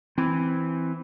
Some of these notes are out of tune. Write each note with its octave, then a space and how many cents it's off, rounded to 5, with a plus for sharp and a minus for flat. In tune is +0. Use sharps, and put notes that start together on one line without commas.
E3 +0 C4 +0